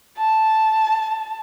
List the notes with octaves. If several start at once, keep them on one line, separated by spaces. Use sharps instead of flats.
A5